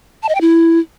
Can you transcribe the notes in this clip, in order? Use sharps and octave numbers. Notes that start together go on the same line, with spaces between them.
A5
D#5
G5
E4